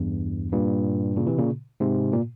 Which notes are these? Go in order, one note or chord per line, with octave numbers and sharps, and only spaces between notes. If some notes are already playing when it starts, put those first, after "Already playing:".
Already playing: E2 G2
G2 A#2
A#2 C#3
C3 E3
A#2 C#3
G#2 C3
A#2